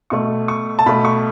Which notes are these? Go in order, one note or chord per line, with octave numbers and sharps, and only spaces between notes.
B2 A3 C#6
C#6
A5
B2 A3 B5
C#6